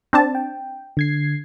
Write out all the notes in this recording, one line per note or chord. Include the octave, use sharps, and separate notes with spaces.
C4 D4 A5
G5
D3 G#6 C7